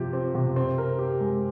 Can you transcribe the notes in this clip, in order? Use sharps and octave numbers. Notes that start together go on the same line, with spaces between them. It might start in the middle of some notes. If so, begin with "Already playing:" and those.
Already playing: C3 F3 G4
C4
C3
C4
A#4
G4
G#3